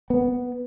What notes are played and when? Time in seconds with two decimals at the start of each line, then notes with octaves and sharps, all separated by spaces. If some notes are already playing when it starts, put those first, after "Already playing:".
0.10 B3